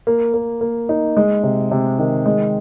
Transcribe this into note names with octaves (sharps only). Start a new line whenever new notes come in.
A#3
A#3
A#3
D#4
G#3
C3
C3
D#3
G#3